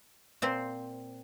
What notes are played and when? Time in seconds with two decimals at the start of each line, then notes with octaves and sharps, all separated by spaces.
0.42 A#2 C4 C5